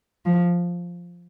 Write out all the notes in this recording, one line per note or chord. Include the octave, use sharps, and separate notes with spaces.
F3